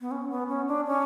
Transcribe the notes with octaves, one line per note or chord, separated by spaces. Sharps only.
B3
C#4
B3
C#4
D4
C#4